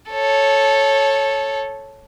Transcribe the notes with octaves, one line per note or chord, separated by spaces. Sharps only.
A4 C#5